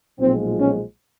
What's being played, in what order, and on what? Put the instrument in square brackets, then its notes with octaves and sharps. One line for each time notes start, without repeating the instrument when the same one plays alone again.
[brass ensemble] B1 A#2 F3 G#3 C4
C#4